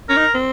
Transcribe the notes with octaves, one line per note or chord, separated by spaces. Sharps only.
C#4 A#4
D#4
C4